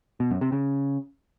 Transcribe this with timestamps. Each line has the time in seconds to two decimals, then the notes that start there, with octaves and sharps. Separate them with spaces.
0.20 B2
0.31 F#2
0.41 C3
0.52 C#3